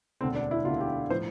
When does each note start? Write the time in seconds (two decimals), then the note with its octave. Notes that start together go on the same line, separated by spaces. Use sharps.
0.21 E1 D2 D3 C4
0.35 D4
0.51 E4
0.65 E1 D2 D3 F4
0.80 G4
1.10 A2 F3 C5